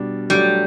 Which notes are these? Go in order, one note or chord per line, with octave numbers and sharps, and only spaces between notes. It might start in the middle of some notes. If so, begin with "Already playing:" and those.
Already playing: B2 G3 D4
F#3 G3 A3 D4